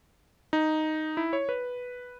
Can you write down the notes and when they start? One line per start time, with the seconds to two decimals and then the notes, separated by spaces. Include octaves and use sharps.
0.53 D#4
1.17 E4
1.33 C#5
1.49 B4